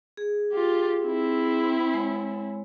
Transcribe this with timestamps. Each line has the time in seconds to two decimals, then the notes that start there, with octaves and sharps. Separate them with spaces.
0.17 G#4
0.53 F4 G4
1.07 C4 E4
1.94 G#3 C#5